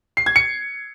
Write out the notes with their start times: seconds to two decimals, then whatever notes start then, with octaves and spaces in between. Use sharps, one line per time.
0.17 C7
0.26 G#6
0.36 C#7